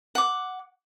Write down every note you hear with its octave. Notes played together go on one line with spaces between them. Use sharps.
F#5 D6